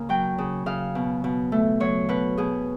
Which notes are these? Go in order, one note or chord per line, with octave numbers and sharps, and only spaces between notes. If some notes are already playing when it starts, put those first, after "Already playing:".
Already playing: C#3 A#3
F#3 G5
C#3
C#3 F5
B2
B2
A3
F#3 C#5
B2 B4
B2 G#4